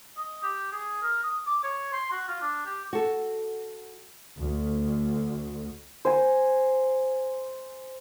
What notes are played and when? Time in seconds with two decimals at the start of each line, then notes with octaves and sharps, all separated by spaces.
0.17 D#5
0.43 G4
0.72 G#4
1.02 A#4
1.23 D#6
1.47 D6
1.63 C#5
1.93 C6
2.12 F#4
2.28 F4
2.42 D4
2.66 G4
2.93 F#4 A4
4.40 D2
6.05 C5 G#5